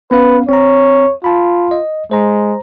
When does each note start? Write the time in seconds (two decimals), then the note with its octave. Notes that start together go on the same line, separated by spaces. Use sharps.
0.11 B3 C#4 B4 F5
0.49 C4 C#5 A#5
1.24 F4 A5 B5
1.71 D#5
2.11 G#3 C5 A#5